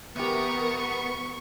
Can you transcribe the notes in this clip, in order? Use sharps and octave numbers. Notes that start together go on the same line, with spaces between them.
E2 B3 G4 A#4 C#6